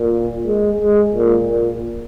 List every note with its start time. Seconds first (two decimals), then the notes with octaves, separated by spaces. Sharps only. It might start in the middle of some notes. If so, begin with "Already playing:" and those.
Already playing: A#2
0.47 G#3
0.81 G#3
1.14 A#2
1.47 A#2